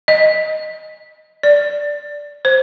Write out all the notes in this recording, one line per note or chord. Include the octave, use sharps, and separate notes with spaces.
D#5
D5
C5